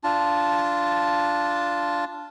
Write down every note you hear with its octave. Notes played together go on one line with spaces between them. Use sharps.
D4 F4 A5